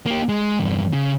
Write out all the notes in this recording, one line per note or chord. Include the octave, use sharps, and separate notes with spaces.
A#3 G4
G#3
E2 G2
C#3